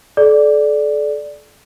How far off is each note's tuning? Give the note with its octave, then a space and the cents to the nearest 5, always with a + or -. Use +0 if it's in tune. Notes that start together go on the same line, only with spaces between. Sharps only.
A4 -35 D5 +0